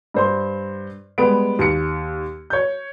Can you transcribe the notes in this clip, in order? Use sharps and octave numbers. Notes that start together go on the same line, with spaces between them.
G2 C5 C6
G3 G#3 B3 D7
D#2 C#7
C#5 G6